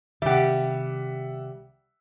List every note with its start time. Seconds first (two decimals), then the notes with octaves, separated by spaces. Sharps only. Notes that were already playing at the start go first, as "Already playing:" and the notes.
0.22 C3 D#3 G3 G4 E5 F#5